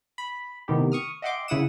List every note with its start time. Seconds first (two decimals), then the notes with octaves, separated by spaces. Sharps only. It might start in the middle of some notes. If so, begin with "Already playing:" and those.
0.18 B5
0.68 A2 C3 D#3 B3 G4
0.92 C#6 D#6 F6
1.22 D#5 E5 F#5 G5 C6 D6
1.48 C#3 E4 F#5 D#6 E7